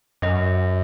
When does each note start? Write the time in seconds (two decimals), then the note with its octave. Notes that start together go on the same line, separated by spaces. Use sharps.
0.22 F#2 D#5